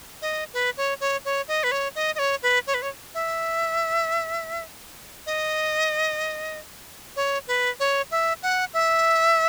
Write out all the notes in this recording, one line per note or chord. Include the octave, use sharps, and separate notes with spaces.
D#5
B4
C#5
C#5
C#5
D#5
B4
C#5
D#5
D#5
C#5
B4
C#5
B4
C#5
E5
D#5
C#5
B4
C#5
E5
F#5
E5